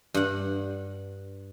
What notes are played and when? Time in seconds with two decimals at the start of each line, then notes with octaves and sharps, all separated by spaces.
0.14 G2 F#5